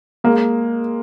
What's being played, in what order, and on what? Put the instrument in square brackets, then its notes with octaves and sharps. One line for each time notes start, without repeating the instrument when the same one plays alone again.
[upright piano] G#3 A#3